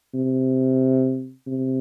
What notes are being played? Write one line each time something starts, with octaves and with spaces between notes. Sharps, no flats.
C3
C3